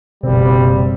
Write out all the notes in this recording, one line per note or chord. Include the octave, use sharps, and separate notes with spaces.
F#1 B2 G3 C4